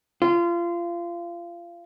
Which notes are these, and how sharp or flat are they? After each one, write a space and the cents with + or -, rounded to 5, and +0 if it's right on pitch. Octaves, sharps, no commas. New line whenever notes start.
F4 -25